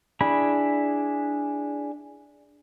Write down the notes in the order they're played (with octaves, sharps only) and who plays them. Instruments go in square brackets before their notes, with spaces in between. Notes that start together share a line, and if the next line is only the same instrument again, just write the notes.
[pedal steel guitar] D4 E4 G#4 B5